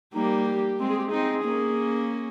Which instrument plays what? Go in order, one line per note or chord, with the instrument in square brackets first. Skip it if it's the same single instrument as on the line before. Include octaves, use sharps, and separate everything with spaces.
[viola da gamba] G3 A#3 [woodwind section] D#4
[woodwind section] G4
[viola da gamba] G#3 C4
[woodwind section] G#4
G4
[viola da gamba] C4 D#4 [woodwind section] G#4
[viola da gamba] A#3 C#4